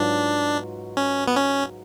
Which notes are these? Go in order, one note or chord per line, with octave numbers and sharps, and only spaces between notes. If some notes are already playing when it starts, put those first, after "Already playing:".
Already playing: G#2 F#3 D4 F4 B4
C#4
B3
C#4